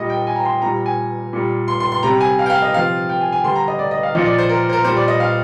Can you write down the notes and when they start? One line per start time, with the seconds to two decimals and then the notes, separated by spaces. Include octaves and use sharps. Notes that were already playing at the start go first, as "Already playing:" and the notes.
Already playing: A#2 G3 D#5
0.10 G5
0.27 G#5
0.36 A#5
0.45 C6
0.62 A#2 G3 A#5
0.86 G#5
1.33 A#2 G3
1.68 C6
1.80 C6
1.92 C6
2.03 C3 G3 A#5
2.21 G#5
2.39 F5
2.46 G5
2.50 F5
2.62 D#5
2.74 C3 F3 F5
3.09 G5
3.21 G#5
3.32 G#5
3.44 D3 G3 C6
3.56 A#5
3.68 D#5
3.79 D5
3.91 D#5
4.03 F5
4.15 A#2 F3 D#5
4.26 D5
4.38 C5
4.49 A#4
4.69 C5
4.73 A#4
4.84 A#2 G3 C5
4.97 D5
5.08 D#5
5.20 F5